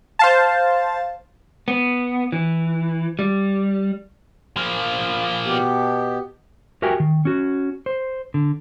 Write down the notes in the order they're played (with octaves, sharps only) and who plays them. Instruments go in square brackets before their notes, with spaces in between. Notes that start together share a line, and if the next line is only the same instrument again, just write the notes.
[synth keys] C5 F5 A5
[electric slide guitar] B3
E3
G3
[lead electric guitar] F3 A#3
[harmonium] B2 B3 G4
[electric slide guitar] F#4 G4 A#4 E5 G5 G#5
D#3
C#4 F#4
C5
D3